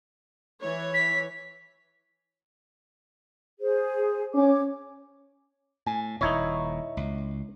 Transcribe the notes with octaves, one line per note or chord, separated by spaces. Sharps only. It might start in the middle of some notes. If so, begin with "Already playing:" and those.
E3 C#5
B6
G#4 C5
C#4 C#5 D6
A2 G#5
D#1 A#2 D#4 E4 C#5
C#2